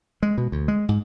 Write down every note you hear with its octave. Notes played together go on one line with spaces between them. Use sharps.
G#3
B2
D2
G#3
G#2